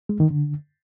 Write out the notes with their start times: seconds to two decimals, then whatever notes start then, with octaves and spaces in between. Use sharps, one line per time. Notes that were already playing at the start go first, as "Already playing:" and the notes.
0.09 G#3
0.20 D#3
0.31 D3